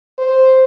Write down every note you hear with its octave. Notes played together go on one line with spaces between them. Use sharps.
C5